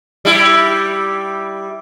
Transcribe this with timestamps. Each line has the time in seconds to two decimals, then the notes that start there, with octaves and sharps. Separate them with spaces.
0.25 G3 E4